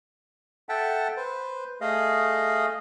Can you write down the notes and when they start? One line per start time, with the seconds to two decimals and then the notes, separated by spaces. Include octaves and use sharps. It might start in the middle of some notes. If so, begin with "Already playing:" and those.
0.69 A4 E5 F#5 G5 A5
1.17 B4 C5
1.81 A3 G#4 D#5 F5